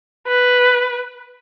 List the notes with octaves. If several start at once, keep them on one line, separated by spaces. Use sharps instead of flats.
B4